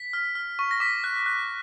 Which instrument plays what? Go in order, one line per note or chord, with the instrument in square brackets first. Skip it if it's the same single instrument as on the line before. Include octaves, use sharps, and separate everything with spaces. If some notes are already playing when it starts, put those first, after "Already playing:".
Already playing: [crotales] B6
F6
F6
C#6
A#6
D6 B6
F#6
F#6